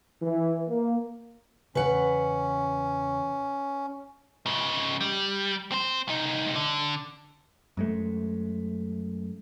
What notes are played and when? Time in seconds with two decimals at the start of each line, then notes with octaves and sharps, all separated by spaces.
0.22 E3
0.68 A#3
1.75 E2 C#3 C#4 B4 F#5
4.46 G#2 C#3
5.01 G3
5.72 C4 C5
6.08 C2 D#4
6.56 D3
7.77 F#2 G#3 A3